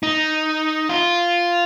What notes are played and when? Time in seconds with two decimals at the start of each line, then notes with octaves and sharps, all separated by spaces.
0.03 D#4
0.89 F4